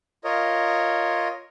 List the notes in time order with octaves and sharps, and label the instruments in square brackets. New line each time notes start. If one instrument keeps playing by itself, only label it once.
[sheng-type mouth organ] F4 A#4 C#5 D#5